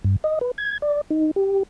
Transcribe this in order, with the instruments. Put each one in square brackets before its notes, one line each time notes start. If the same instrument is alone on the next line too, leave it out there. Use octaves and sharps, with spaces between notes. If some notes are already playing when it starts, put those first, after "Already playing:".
[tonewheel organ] G2
D#5
B4
G#6
D5
D#4
G4